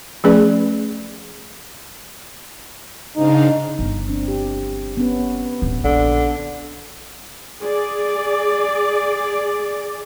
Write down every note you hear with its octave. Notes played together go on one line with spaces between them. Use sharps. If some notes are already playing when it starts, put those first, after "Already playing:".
F3 A3 C#4 G#4 B4 D5
G#2 C#3 D4 D#4 F5
G1
F3 C4 D4
G4
B3 C#4 B4
D1 E4
A#1 D3
G#4 D5